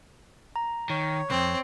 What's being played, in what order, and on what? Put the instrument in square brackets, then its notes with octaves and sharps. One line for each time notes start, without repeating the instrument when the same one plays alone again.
[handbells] A#5
[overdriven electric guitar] D#3 [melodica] C#5
[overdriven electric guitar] C2 F2 [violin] C4